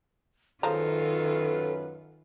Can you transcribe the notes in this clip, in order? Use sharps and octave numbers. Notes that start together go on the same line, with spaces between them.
F#2 D#3 F3 G#3 F4 A4 B4 A#5